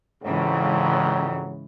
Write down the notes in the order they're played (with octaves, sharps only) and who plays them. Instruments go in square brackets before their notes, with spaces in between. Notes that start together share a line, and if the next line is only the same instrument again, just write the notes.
[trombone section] A#1 F2 F#3 [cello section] G#2 C#3 E3